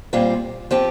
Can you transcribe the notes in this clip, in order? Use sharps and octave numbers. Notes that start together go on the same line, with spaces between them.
A#2 G3 C4 F4
F3 C4 G4